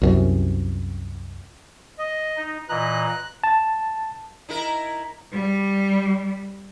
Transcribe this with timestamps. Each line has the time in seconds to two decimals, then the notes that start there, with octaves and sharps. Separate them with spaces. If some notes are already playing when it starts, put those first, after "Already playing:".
0.02 C2 F#2 C3
1.99 D#5
2.36 D#4
2.69 A#2 E3 D#5 A#5 F#6
3.44 A5
4.49 D#4 E4 A#4
5.31 G3